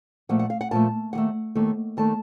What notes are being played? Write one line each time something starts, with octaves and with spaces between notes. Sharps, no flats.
A#2 F3 A3 F#5
F#5
F5
F#5
A#2 F3 A3 A5
D#2 D#3 A3 F#5
D#2 D#3 A3
D#2 D#3 A3 A5